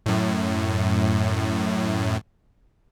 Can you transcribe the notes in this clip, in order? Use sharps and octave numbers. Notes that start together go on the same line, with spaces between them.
F#2 A2